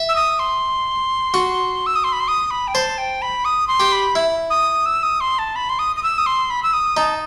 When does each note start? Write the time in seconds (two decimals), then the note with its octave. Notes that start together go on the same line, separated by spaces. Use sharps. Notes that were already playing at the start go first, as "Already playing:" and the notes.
Already playing: E5
0.09 E6
0.16 D#6
0.39 C6
1.34 F#4
1.86 E6
1.96 D#6
2.04 C6
2.12 B5
2.20 C6
2.28 D#6
2.51 B5
2.68 G5
2.74 C5 A5
2.98 G5
3.22 B5
3.45 D#6
3.68 C6
3.80 G4
3.92 B5
4.15 E4
4.50 D#6
4.86 E6
5.03 D#6
5.21 C6
5.39 A5
5.56 B5
5.69 C6
5.79 D#6
5.96 D#6
6.03 E6
6.18 D#6
6.26 C6
6.50 B5
6.63 E6
6.73 D#6
6.97 D#4 A5